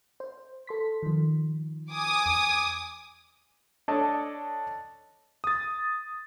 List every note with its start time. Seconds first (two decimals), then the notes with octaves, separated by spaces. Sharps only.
0.20 C5
0.67 A4 C6 B6
1.03 D#3 F3
1.92 G#5 D6 D#6
2.26 E2
3.88 D4 A4 C#5 D#5 A5
5.44 D#6 A6